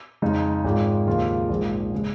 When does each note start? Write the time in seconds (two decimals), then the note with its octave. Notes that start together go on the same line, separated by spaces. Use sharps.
0.22 F2 C#3 G#3 D#4
0.64 G#1 G#2 G#3 F4
1.06 D#2 C#3 F3 G#3 F4
1.49 A#1 G#2 F3
1.94 C#3 G#3